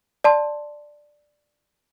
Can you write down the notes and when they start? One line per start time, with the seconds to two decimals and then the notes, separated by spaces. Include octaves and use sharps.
0.24 D5 A5 C6